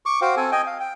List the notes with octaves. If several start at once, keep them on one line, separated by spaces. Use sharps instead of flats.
C#6 D6
F#4 C5 F5 G5
C4 A4 G#5
D#5 G5 G#5
F5
G5